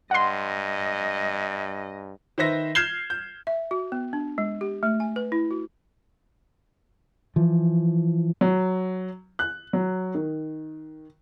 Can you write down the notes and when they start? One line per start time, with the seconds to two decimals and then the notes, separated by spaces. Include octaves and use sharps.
0.11 G2 D#5 F#5 C6
2.38 D#3 B4 C5 E5 A#6
2.75 F6 G6 G#6 C7 E7 G7
3.10 G6
3.47 E5
3.71 F#4
3.92 B3
4.13 D4
4.38 G#3
4.61 G4
4.83 A3
5.00 G#5
5.16 B4
5.32 E4
5.51 F#4
7.36 E3 F3
8.41 F#3
9.39 F#6
9.73 F#3
10.15 D#3